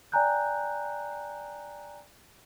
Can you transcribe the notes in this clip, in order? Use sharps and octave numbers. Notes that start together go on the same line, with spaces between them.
D5 G5 G#5 A#5 F#6 G6